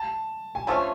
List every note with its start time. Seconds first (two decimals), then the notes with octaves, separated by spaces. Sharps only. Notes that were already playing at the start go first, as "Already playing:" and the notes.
Already playing: A5
0.55 G#5
0.67 D3 F3 A3 C#4 A5